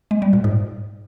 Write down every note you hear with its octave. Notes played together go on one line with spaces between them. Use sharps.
G#3
G3
A#2
G#2